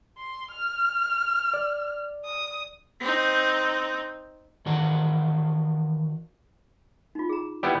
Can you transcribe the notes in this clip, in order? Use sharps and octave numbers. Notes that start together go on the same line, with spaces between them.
C6
F6
D5
D#6
C4 D#4
D#3 E3 F#4 D5 F#5
D#4 F4
G#4 A#5
B3 E4 G4 D5